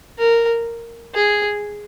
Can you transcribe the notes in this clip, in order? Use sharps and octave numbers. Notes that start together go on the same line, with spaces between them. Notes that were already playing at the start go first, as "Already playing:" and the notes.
A#4
G#4